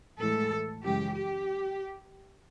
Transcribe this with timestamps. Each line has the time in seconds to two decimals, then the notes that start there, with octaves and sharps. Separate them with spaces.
0.18 A2 E3 G#3 A4
0.82 F#2 C#3 E3 G#3 G4
1.14 G4